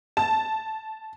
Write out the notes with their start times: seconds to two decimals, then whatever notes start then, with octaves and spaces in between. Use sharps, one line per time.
0.17 A5